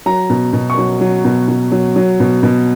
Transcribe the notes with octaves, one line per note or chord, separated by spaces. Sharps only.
F#3 A#5
B2
B2
C#6
F#3
F#3
B2
B2
F#3
F#3
B2
B2